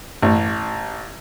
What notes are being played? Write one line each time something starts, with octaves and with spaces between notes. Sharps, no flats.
A1